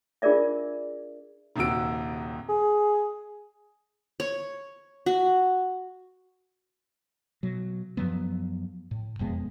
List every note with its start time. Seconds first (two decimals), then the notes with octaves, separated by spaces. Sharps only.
0.22 D4 F4 G#4 A#4 D5 E5
1.56 D#1 D#2 C3 F#4 E6 D7
2.49 G#4
4.20 C#5
5.06 F#4
7.43 B2 F#3
7.97 F#2 F3 F#3 B3
8.91 A2
9.19 E1 F2 G#3 B3